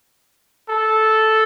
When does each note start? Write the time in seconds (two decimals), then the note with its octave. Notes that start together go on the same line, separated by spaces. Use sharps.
0.69 A4